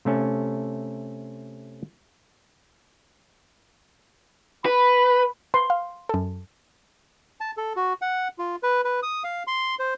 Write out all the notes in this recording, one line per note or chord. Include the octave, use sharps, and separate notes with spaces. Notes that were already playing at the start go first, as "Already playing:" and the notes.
C3 A3 C#4 A5
B4 B5
B4 C6
F5
F#2 A4
A5
A4
F#4
F#5
F4
B4
B4
D#6
F5
C6
C5